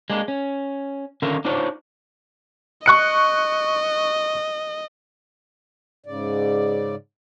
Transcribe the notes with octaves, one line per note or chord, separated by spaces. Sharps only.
G#3 A#3 D4
C#4
D3 D#3 C#4 F4 A#4 E5
D4 D#4 F4 C5 C#5
D#5 C#6 F#6 C#7
G#2 C#3 D5